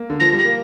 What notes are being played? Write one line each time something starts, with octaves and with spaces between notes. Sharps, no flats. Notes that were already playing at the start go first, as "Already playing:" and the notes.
Already playing: A#3
D3
F3 A#6
G3
A#6
A#3